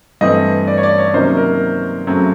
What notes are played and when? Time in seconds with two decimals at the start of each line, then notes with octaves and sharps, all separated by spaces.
0.21 G2 E3 A3 C4 D#5
0.67 D5
0.78 C#5
0.83 D5
0.98 C#5
1.14 C3 D#3 F#3 A#3 C#4 C5
1.37 A#4
2.07 F#2 C#3 F#3 A3 C4